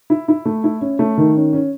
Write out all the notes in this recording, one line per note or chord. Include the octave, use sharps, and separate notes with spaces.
E4
E4
A3
E4
C#4
A3
D#3
C#4
C#4